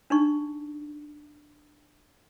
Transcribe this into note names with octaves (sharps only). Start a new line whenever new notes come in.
D4 D#4 C#6